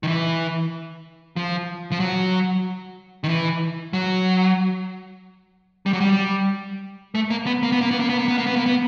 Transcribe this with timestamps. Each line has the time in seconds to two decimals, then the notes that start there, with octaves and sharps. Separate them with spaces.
0.03 D#3
0.07 E3
1.36 F3
1.91 F3
2.00 F#3
3.24 D#3
3.29 E3
3.93 F#3
5.86 G3
5.93 F#3
6.00 G3
7.15 A3
7.30 A#3
7.47 B3
7.63 A#3
7.72 B3
7.81 A#3
7.91 B3
8.00 A#3
8.09 B3
8.19 A#3
8.28 B3
8.38 A#3
8.47 B3
8.56 A#3
8.66 B3